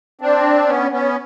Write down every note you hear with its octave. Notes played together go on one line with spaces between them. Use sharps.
C4 D4
B3 C#4
B3 C#4